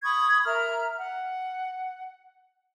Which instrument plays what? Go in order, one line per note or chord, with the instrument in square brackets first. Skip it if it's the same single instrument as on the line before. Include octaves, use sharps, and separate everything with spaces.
[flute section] B5 C#6 D#6 G#6
A#4 E5 A#5 F6
F#5